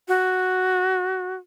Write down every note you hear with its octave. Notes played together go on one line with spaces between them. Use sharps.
F#4